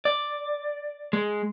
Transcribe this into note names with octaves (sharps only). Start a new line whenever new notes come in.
D5
G#3